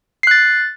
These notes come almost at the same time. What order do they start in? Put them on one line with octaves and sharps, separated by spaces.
C7 F#6 A6